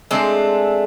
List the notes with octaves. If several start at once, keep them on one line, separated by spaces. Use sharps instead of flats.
G#3 A3 C4 D4